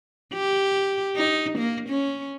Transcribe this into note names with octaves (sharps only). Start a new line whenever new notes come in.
G4
D#4
A#3
C#4